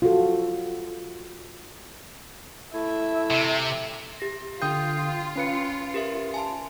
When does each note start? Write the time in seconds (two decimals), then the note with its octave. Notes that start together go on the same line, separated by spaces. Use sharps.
0.02 F4 F#4 A4
2.74 A3 E4 E5
3.30 C3
4.20 G4 A#6
4.62 D3 F4 G5 D#6 G6
5.36 C#4 B4 C#7
5.94 G4 A#4 E5
6.34 G#5 A5 C6